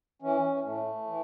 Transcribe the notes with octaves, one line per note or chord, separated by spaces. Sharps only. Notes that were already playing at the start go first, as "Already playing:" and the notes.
E3 C#4
A2 A3
E3